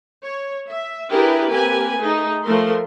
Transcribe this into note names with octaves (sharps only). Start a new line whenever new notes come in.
C#5
E5
D4 E4 G4 G#4 A#4 B4
A#3 C4 G4 A#4 B4 G#5
A3 D#4 G#4
F3 A3 A#4 C6